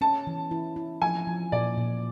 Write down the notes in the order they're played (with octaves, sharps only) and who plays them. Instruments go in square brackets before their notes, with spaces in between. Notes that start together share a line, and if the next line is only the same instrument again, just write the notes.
[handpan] C#4 [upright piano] A5
[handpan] E3
E4
E4
[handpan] F3 [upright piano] G#5
[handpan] F3
[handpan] A#2 [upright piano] D5
[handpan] A#2